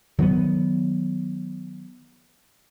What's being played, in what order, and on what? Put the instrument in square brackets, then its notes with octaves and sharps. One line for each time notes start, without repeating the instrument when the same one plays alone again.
[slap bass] D#3 F#3 A#3 B3